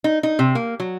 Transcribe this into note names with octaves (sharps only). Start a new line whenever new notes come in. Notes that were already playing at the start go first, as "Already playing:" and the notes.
D#4
D#4
C3
A#3
F#3